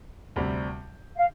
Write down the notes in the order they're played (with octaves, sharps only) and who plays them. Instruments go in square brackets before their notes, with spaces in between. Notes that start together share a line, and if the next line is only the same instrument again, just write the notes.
[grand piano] D2 C3 G3 C4
[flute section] F5